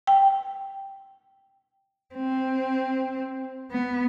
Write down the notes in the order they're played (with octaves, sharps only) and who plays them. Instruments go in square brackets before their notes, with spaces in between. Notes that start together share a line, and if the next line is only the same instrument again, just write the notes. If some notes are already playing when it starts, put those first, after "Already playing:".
[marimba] G5
[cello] C4
B3